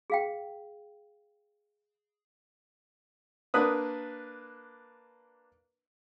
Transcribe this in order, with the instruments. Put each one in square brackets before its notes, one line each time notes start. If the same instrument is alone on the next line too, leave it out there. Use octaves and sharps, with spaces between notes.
[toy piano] G#4 F5 G5
[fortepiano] A#3 D4 B4 D#6